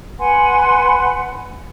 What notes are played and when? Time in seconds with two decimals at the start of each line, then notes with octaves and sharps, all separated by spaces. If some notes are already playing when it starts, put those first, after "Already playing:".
0.20 B4 F#5 G#5 C6